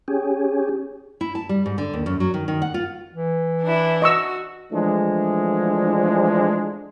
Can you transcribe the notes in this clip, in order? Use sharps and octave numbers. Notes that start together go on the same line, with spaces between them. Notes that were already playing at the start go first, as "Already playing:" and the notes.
C#4 G4 G#4
E4
A5
G3
G#2
D3
D#2
F#2
F#3
D#3
D#3
F#5
F4
E3
D4 E4
F#4 D#5 C#6 E6
E3 F3 G#3 A3 D4